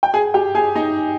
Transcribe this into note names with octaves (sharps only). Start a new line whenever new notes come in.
G5
G#4 G#5
G4 G5
G#4 G#5
D#4 D#5